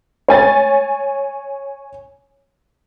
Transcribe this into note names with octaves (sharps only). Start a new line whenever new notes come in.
C#5 G#5 A6